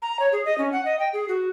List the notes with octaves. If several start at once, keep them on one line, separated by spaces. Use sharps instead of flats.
A#5
C#5
G#4
D#5
C#4
F#5
D#5
G5
G#4
F#4